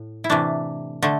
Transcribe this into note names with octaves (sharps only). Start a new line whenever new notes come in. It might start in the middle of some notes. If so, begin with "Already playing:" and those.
Already playing: A2
E4
C3 E3 A3 D4
D3 A3